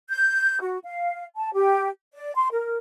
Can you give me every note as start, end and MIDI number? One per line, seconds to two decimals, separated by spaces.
0.09 0.60 91
0.61 0.77 66
0.84 1.24 77
1.35 1.52 81
1.53 1.89 67
2.13 2.33 74
2.35 2.48 84
2.52 2.77 70